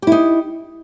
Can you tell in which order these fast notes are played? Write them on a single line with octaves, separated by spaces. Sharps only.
G4 E4 D#4